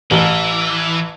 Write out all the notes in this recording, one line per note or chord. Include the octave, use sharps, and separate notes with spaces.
A1 E3